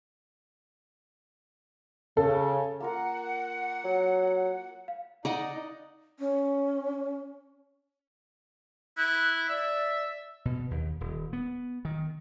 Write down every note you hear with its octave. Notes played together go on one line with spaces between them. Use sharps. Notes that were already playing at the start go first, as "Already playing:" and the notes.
C#3 A4
A#3 F4 A#4 F#5
F#3
F5
D#4 D5 D#5 F#5
C#4
E4 F#6
D5 E5
B2
D#2
D#1
B3
D#3